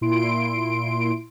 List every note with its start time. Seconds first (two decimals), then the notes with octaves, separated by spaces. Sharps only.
0.01 A#2 E4 C6 D7